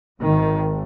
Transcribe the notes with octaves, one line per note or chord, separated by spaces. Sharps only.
G#1 G#2 D#3